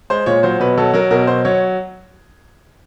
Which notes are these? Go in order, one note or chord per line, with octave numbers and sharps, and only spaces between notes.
G#3 C5
A#2 C#5
F#3 C5
B2 B4
F#3 A4
F#3 A#4
B2 A#4
F#3 C5
F#3 C#5